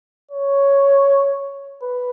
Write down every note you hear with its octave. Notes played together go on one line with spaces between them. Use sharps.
C#5
B4